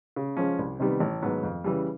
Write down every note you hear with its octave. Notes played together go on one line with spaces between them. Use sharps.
C#3
F3 G#3 C#4
C2
C3 D#3 G3 B3
A1
G#2 D#3 F#3 B3
F2
C#3 E3 G3